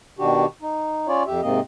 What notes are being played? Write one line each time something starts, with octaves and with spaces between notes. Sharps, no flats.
B2 D#3 D4 F#4 G4
D#4
C#4 F4 C#5 D5
F2 G4 E5
G#2 C3 A#3 C4 D#5